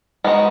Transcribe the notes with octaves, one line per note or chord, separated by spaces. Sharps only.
G#3 B3 D#4 F#4